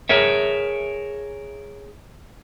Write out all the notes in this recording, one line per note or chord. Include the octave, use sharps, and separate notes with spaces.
G#4 A#4 C#5 E5